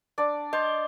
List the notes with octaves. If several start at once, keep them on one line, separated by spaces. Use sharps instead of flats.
D4 D5
C5 D#5